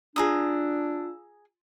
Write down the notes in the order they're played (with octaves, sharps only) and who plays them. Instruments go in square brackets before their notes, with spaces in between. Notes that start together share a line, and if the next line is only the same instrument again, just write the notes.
[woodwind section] D4 [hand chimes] F4 E6 [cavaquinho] G#4 A#5 D#6